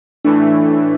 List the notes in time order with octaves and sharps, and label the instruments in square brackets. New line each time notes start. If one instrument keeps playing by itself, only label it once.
[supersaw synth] A2 E3 A3 [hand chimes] D4